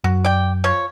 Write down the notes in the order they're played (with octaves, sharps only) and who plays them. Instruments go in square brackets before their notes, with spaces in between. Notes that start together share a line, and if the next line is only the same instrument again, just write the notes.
[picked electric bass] F#2 [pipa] F#4
[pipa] D5 G5
F3 C#5